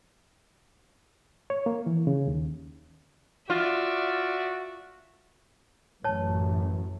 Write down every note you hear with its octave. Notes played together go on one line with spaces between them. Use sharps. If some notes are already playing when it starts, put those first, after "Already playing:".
C#5
A#3
E3
C#3
D#2
F4 F#4 D5 E5
A1 F#2 C#5 A5